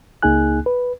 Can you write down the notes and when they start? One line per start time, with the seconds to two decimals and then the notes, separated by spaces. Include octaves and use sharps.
0.22 C#2 A#3 D#4 G#4 G#5 F#6
0.66 B4